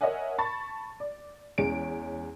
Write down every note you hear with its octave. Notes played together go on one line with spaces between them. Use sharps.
A#4 C#5 D#5 E5 F#5 G#5
A5 B5 C#6 A6
D5
E2 G#3 C#4 C#5 D7